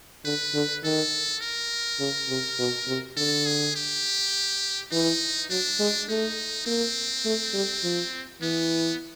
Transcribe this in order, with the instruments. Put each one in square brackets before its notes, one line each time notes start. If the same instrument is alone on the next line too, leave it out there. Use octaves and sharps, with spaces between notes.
[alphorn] D3 [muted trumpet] B4
[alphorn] D3
[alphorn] D#3 [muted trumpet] A4
[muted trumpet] A#4
[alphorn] C#3
C3
B2
C3
[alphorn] D3 [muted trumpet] A4
[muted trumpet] G#4
G4
[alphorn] E3 [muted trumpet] D#4
[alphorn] F#3 [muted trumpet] D4
[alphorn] G#3
[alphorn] A3 [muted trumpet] D#4
[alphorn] A#3 [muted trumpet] C4
[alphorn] A3
G3
F3
[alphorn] E3 [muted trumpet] B3